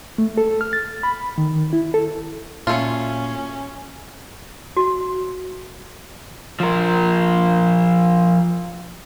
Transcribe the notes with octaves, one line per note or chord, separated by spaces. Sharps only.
A3
A4
F6
A6
B5
D#3
E4
A4
A#2 F#3 A3 C#4 F4
F#4
F3 A#4